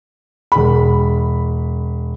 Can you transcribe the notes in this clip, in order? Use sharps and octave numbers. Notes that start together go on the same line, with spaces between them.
E1 B5